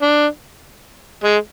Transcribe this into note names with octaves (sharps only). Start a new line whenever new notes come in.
D4
G#3